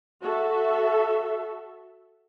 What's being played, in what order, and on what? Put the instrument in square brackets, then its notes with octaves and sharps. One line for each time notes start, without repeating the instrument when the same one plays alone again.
[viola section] F#4 A4 E5